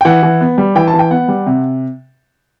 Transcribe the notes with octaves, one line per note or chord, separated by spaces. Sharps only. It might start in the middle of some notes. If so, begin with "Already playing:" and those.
G5
E3 F#5
E3
B3
G3
E3 G5
A5
E3
G5
B3 F#5
G3
C3